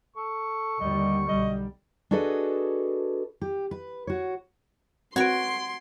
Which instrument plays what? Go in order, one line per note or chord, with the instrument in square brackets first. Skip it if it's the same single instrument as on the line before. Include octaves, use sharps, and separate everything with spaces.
[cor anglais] A4 [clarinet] C#6
[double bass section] D#2 D3 G3 [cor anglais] D#5
[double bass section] B1 G3 [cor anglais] D#5
[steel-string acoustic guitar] D4 F#4 G#4 A4 B4 D#5
G4
B4
F#4 C#5
[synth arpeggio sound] C4 B4 [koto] F#4 C#5 [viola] C6 [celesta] G#6 D7